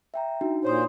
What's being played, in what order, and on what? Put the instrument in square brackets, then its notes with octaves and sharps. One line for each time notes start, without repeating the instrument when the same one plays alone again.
[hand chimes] E5 G5 A#5
D4 D#4 F#4
[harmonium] A#2 C5 [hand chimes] C#5 C6 D#6